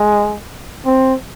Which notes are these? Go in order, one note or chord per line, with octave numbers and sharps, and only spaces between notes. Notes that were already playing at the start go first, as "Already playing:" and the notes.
Already playing: G#3
C4